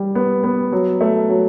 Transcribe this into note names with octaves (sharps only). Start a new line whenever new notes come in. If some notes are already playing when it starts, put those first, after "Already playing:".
Already playing: G3
B3
B3
F#3
A3
F#3